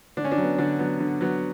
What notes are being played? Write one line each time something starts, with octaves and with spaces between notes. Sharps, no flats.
D3 D4
C#4
D4
F#3
B3
D3 D4
F#3 B3
D3
F#3 B3